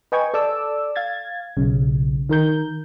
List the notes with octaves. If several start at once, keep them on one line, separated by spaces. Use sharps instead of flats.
B4 D#5 G5 G#5 C#6 G#6
A4 D5 D6 E6
F5 G#6 A6
B1 C#3
D#3 A#4 G6